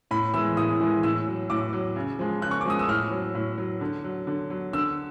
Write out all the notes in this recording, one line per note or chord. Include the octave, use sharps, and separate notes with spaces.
A2 B5
E3 G#3 E6
A2 D#6
E3 G#3
A2 E6
F#3
A2 D6
F#3
C#3
F3 G#3
C#3 F#6
C#6
D6
F3 G#3 D#6
E6
A2 F6
F#3
A2
F#3
D3
F#3
D3
F#3
D3 E6